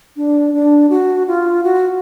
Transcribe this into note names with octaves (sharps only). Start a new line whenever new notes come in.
D4
D4
F#4
F4
F#4